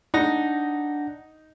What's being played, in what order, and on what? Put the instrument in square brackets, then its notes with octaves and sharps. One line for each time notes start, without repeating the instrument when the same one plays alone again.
[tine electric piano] D4 F#5 A#6 [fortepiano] D#4